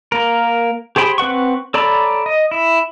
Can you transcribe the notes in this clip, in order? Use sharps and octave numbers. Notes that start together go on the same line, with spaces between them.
A#3 A#4
G4 G#4 C5 G5 B5
C4 B4 F#5 C#6
A4 C#5 D5 A#5 B5
D#5
E4